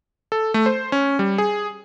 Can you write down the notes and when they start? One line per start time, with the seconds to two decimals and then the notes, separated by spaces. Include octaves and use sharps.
0.32 A4
0.54 A3
0.66 C5
0.92 C#4
1.19 G3
1.38 G#4